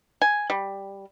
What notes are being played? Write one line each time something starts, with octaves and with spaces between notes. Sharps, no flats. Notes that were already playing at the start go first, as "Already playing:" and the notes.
G#5
G3